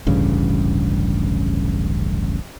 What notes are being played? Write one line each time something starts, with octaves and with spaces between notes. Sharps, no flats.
D1 A1 G2 C#3